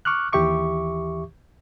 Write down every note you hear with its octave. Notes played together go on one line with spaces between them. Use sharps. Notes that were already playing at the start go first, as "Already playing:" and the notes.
C#6 D6 F6 F#6
D#2 E3 G4 E5 C#6 D6